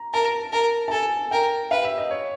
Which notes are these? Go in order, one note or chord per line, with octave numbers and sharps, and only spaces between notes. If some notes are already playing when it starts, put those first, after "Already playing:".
Already playing: A#5
A#4 A5
A#4 A5
A5
A4 G#5
A#4 G5
B4 F5
E5
D#5
C#5